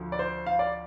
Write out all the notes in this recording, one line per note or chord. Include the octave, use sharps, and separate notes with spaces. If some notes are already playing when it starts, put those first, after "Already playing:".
Already playing: D2 D3 F3
D5
C5
F5
D5